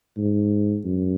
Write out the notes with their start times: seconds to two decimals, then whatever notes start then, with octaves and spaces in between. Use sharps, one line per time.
0.17 G#2
0.85 F#2